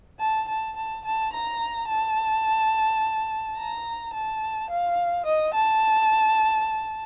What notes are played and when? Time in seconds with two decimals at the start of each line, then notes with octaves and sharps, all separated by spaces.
0.20 A5
0.48 A5
0.77 A5
1.05 A5
1.33 A#5
1.89 A5
3.57 A#5
4.13 A5
4.70 F5
5.26 D#5
5.54 A5